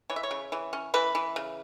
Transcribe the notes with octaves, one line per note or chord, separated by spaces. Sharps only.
E3 C#5
E5
C#5
C#3
E3
C#4
E3 B4
E3
C#3